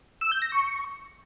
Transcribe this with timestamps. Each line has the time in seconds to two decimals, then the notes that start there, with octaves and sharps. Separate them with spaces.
0.21 E6
0.32 G6
0.42 A#6
0.52 C#6